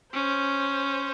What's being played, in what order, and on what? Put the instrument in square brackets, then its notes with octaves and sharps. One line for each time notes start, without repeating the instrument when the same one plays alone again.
[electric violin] C#4 [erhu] C5